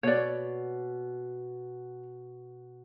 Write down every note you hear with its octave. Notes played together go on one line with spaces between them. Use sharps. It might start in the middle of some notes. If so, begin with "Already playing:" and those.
B2 C#5 D5